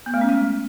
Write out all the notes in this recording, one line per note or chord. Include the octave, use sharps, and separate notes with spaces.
B3
A3
C#4
G#3